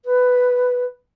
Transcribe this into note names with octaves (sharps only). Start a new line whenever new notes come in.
B4